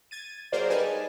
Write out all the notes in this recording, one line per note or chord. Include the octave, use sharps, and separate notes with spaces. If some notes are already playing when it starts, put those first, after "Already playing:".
G#6 A6 D#7
F#3 A#3 G#4 A#4 C5 D5
G3 D#4 B4 G#5 A5